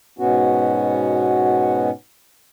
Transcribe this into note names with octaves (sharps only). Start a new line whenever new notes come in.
G#2 B2 B3 C#4 F#4